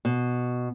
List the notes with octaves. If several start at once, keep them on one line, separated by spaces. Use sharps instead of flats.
B2